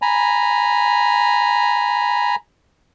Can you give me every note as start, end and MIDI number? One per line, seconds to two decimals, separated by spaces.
0.02 2.35 80
0.02 2.35 82
0.02 2.35 83